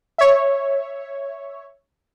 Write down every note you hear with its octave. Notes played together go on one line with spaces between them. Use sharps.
C#5 E5